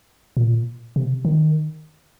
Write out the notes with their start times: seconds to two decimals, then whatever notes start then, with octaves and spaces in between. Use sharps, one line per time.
0.37 A#2
0.96 C3
1.25 D#3